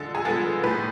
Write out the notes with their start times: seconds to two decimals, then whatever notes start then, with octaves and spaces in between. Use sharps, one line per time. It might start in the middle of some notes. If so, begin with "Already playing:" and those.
Already playing: D3 F3 G#3 A4
0.15 G#4
0.24 F3 G#3 B3 A4
0.64 A2 B4